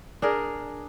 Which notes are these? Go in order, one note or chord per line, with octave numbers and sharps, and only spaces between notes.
D4 G#4 A#4